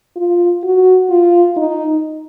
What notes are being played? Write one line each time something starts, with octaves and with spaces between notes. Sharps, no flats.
F4
F#4
F4
D#4